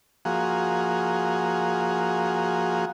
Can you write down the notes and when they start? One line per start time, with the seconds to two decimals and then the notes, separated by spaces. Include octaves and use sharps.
0.25 F3 A#3 F#4 G#4